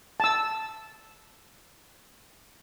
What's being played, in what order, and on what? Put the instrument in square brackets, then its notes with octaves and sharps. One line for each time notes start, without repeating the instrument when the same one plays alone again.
[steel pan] A5 E6